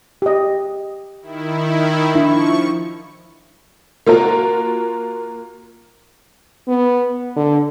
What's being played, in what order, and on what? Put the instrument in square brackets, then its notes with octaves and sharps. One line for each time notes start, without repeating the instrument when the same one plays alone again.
[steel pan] G4 D#5
[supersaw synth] D#3 E4
[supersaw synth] F3 C#6 [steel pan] D4 E4
[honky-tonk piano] A#3 F4 F#4 A#4
[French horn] B3
D3